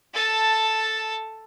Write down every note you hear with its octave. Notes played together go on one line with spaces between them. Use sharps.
A4 A5